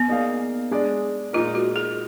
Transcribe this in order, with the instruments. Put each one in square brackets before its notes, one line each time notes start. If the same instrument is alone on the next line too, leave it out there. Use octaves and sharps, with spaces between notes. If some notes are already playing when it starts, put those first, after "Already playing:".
Already playing: [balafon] B3
[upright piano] A#3 D#4 G#4 D5 F5
G#3 D4 G#4 D5
[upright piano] A#2 G#3 D#4 A#4 [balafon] F4
[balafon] F#4
G#4